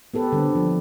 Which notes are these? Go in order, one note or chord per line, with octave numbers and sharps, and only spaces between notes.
B3 G4 A4 B4
D3 G3 C4
F3